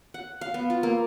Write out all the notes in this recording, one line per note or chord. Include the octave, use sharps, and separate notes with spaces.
F#5
F5
B3
F4
A#3